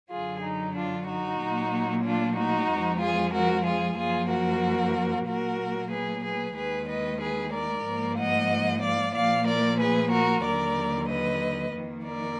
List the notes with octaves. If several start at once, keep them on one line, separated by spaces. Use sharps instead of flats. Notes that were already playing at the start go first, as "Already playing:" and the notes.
F#2 D3 F#3 F4 G#4
D#4
D4 F4
D#4 F#4
A#2 F#3 A#3
D4 F4
D#4 F#4
F2 F3 G#3
F4 G#4
F#4 A#4
F4 G#4
F#2 F3 A#3 F4 G#4
F#4 A#4
A#2 F#3 A#3 F#4 A#4
G#4 B4
G#4 B4
D#2 D#3 G#3 G#4 B4
B4 D#5
G#4 B4
A#4 D5
G#2 F3 A#3
D#5 F#5
D5 F5
A#2 F3 A#3 D5 F5
A#4 D5
G#4 B4
F#4 A#4
D#2 D3 F#3 A#4 D5
B4 D#5
F2 D#3 A#3
A#4 D5